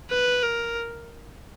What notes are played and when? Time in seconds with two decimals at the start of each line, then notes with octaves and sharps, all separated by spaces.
0.11 B4
0.43 A#4